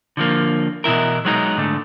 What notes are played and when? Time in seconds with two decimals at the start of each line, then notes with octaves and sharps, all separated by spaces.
0.17 D3 F3 A#3
0.84 B2 E3 E4 A#4
1.25 F#3 G#3 B3 D#4 A#5
1.57 G#2 D3 A3